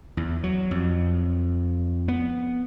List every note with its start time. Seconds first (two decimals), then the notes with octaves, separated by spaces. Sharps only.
0.17 E2
0.44 F#3
0.71 F2
2.08 B3